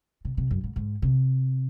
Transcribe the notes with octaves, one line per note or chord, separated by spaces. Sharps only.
C3
C3
F#2
G#2
G#2
C3